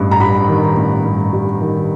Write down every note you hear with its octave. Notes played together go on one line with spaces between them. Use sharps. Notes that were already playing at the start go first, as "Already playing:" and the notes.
Already playing: A1 G2
A#5
G3 B5
D#3
A1
G2
G3
D#3